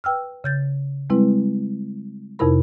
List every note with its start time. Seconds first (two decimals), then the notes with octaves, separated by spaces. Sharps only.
0.04 B4 G5 E6 F6
0.44 C#3 G6 A6
1.10 G3 G#3 C4 E4 B4
2.39 F2 C3 D#4 E4 A#4 B5